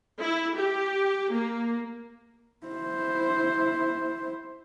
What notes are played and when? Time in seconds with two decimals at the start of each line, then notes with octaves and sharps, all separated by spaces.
0.21 E4
0.57 G4
1.33 A#3
2.67 E4 C5